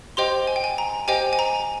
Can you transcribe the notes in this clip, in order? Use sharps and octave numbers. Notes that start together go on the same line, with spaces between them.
G4 C5 D#5 G5 C6
G#5
G5
G#5
A#5
G4 C5 D#5 G5 G#5
G#5
A#5